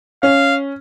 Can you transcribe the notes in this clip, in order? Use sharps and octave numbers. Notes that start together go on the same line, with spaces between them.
C#4 F5